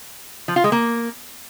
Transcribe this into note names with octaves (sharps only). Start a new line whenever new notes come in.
F3
F4
G#3
A#3